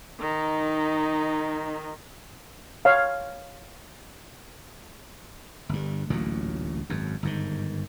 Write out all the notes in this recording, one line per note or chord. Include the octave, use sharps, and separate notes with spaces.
D#3 D#4
C#5 F5
G1 G2
A1 D2 A#2 F#3
G#1 F#2
G1 G#2 D#3